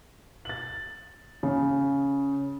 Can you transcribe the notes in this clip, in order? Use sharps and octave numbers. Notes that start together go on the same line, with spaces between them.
A6 F#7
C#3